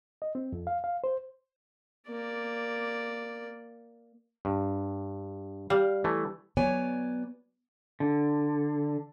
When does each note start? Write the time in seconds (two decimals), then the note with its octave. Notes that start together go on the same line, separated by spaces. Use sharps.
0.22 D#5
0.35 C4
0.53 F2
0.67 F5
0.84 F5
1.04 C5
2.09 A#3 D5
4.45 G2
5.70 G3 F5
6.04 E3 A3
6.57 F#3 B3 C#5 D5 G#5
8.00 D3